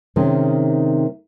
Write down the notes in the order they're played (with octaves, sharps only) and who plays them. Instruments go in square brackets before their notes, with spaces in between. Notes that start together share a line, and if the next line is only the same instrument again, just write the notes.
[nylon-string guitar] C3 D#3 G#3 C#4